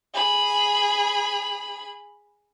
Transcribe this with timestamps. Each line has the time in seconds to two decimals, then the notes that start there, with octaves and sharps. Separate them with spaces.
0.14 G#4 B5